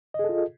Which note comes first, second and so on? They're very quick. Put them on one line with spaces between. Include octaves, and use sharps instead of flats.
D#5 G#4 A4 F4